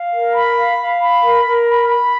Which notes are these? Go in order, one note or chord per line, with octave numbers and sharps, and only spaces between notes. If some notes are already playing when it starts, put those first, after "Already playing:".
Already playing: F5
A#4
B5
F5
F5
B5
A#4
A#4
B5
B5